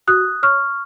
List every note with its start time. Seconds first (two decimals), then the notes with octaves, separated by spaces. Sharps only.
0.08 F#4 D#6 F#6
0.43 C#5 C#6 F6